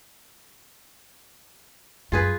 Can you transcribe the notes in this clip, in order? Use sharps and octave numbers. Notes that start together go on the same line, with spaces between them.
F#2 F4 G#4 B4